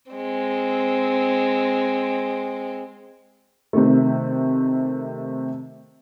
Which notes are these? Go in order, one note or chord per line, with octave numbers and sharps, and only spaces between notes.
G#3 C4
C3 D#3 A3